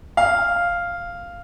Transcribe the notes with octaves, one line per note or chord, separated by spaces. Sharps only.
F5